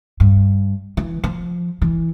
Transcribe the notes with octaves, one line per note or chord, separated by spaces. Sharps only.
G2
E3
F3
E3